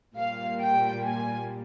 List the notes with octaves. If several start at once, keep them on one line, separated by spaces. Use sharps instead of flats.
A#2 G3 A#3 F5
G5
G#5